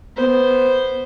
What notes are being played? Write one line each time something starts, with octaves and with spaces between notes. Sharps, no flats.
B3 C5